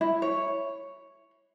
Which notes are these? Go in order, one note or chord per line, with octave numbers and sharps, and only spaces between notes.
E4
C#5